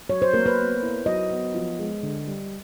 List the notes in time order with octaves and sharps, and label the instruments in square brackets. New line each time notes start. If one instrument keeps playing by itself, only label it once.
[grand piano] F#3 [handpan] C#5
[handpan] C5
[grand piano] A#3 [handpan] A#4
[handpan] B4
[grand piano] B3
E4
[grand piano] F#3 [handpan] D#5
[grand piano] B3
F3
G#3
D3
G3